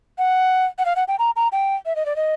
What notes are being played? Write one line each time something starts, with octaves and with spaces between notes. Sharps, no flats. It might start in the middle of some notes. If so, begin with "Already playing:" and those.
F#5
F#5
F5
F#5
G5
A#5
A#5
G5
E5
D#5
D5
D#5